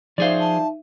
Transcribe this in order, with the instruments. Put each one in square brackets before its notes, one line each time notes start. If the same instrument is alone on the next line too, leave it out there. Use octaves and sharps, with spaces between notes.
[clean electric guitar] F3 G#4 C5 [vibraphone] D#4 E5 [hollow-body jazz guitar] D5 F5
[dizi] A5